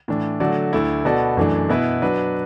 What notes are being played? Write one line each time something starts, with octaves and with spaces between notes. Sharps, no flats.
A2 E3 D4
D3 F#3 A3 F#4 D5
D2 D3 A3 E4
B2 B3 F#4 A4 D5
F#2 E3 A3 D4
B2 B3 E4 B4
F#3 D4 B4